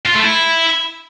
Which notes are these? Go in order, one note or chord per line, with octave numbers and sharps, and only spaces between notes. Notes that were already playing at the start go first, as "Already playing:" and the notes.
F4
A3
E4